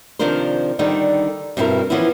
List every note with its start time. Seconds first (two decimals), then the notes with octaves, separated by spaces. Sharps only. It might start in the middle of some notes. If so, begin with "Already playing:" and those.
0.19 C3 D#3 F3 D4 A#4 C5
0.79 D3 D#3 G3 D#4
1.57 G2 B2 C4 D4 E4 A#4
1.90 E3 F3 B3 C#4 E4